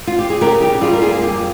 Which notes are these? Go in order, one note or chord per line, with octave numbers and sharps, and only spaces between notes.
F4
G4
G#4
C#3 G4 A#4
D#4 G4
G3 F4 G#4
A#4
A#3 F4 G#4
G#4
F2 G4